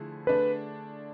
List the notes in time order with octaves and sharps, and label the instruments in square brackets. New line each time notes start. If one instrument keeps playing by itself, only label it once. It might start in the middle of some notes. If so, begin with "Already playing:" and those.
Already playing: [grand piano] D3 F3 A3 E4 G#4
[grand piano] D3 A3 D4 G#4 [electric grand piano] B4